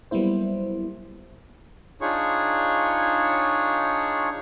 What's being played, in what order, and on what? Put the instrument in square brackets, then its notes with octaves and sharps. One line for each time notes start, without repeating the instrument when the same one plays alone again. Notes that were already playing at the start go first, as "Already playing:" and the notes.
[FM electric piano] F#3 G3 A#3 B3 E4 C5
[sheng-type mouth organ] D4 D#4 F4 G#4 C#5 C#6